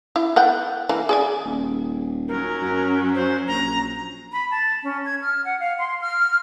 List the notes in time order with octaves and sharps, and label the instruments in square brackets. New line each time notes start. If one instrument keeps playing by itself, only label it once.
[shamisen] E4
B3 F#5 G5
E3 A#3
G#4 D5 G#5
[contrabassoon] D#1
[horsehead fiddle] F#3 C#4 [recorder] A#4
[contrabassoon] F#2
[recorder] C5
[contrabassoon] A#1 [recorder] A#5
[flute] B5
A5
C#4
G#6
F6
F#5
F5
C6
F6